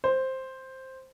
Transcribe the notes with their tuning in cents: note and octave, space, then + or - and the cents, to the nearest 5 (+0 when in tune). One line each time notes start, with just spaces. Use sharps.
C5 +5